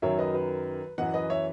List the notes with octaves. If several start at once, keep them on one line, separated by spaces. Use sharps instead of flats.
F#2 D#3 F#3 C#5 E5
B4 D#5
B4
F#2 E3 D#5 F#5
B4 D#5
C#5 E5